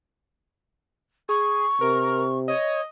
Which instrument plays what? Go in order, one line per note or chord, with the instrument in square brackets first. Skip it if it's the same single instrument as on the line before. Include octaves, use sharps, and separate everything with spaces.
[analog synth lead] G#4 [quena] C#6
[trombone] C3 [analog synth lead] A#4
[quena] C#5 [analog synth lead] D#5